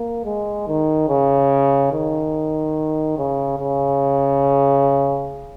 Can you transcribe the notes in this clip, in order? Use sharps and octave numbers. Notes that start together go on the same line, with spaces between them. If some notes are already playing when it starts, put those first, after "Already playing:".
Already playing: A#3
G#3
D#3
C#3
D#3
C#3
C#3